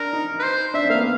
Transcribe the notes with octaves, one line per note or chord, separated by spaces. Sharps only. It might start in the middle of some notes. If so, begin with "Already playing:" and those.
Already playing: D4 A#4
D#4
B4
C5
D4 E5
C4
A#3 F5
B3